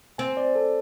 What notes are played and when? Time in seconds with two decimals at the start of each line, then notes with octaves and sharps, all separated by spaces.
0.18 C4 G#5
0.37 D5
0.55 A4